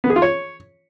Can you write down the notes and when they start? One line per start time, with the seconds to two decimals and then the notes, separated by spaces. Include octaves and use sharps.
0.04 B3
0.10 G#4
0.16 F4
0.22 C#5